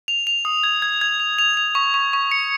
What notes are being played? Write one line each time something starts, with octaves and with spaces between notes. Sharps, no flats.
F7
F7
D#6
G#6
G#6
G#6
F7
F7
F7
C#6
C#6
C#6
C#7